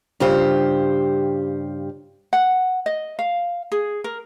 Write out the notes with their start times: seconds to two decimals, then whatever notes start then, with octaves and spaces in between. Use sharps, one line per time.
0.20 G2 C#3 F4 G4 C5
2.33 F#5
2.86 D#5
3.19 F5
3.72 G#4
4.04 A#4